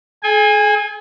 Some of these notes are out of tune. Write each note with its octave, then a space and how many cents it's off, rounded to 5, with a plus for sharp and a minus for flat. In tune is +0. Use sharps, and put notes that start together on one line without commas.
G#4 +45 G#5 -20